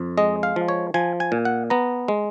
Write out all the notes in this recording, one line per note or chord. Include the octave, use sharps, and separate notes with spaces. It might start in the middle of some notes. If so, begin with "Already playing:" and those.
Already playing: F2
G#3 D#5
F5
F3
C#5
F3 G#5
G#5
A#2
F#5
B3 A#5
G#3